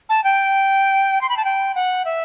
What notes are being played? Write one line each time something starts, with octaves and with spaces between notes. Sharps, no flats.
A5
G5
C6
B5
A5
G5
F#5
E5